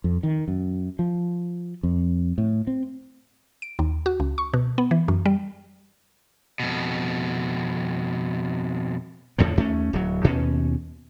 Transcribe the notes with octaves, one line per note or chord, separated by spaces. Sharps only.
F2
D#3
F#2
F3
F2
A2
C4
D7
D#2
F#4
C#2
C#6
B2
B3
E3
F#2
G3
F2 B2
E2 A2 D3 F3
D#2 A3 C#4
D1 F#3
D#2 B2 C#4